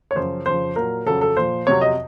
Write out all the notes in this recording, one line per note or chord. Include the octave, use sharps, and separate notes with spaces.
C#5
F#2 C#3 F3 C5
F2 C#3 F3 C5
A#2 F#3 A#4
F2 C#3 F#3 A4
A4
A#2 F3 C5
F2 C3 F#3 C#5
D#5